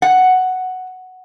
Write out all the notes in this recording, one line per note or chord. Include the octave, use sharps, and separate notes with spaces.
F#5